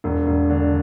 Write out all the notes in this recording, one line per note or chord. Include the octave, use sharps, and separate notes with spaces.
E1
E1
D3